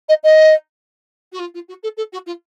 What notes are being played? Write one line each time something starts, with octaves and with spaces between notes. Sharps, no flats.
D#5
D#5
F#4
F4
F4
F#4
A4
A4
F#4
F4